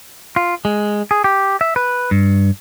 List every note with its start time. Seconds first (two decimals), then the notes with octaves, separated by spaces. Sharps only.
0.36 F4
0.65 G#3
1.11 G#4
1.24 G4
1.61 E5
1.76 B4
2.11 G2